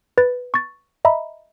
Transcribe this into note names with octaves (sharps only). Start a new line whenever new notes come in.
B4 A6
C#6 A6
D#5 E5 A#5 B5